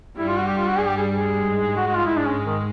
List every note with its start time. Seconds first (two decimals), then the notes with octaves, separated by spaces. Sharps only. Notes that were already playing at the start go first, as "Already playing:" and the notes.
0.18 G2 G3 E4
0.28 F4
0.38 F#4
0.48 G4
0.57 F4
0.67 F#4
0.78 G#4
0.87 G4
0.97 G#4
1.14 G#4
1.37 G#2 G#3
1.77 F#4
1.87 F#4
1.96 F4
2.06 E4
2.17 D4
2.27 C#4
2.46 D#3